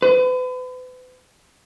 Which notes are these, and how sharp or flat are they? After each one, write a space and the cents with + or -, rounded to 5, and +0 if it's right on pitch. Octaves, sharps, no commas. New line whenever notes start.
B4 +40